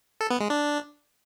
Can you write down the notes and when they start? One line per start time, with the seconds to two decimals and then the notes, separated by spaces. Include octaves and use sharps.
0.21 A4
0.30 B3
0.40 G#3
0.50 D4